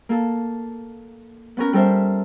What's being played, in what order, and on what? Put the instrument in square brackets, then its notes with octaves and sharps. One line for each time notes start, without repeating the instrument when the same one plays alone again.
[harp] A#3 A4
B3 C#4 A#4
G3 A4 A#4 C5 E5